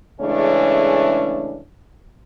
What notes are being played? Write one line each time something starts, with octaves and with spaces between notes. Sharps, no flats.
C#3 E3 G#3 A3 C#4 D4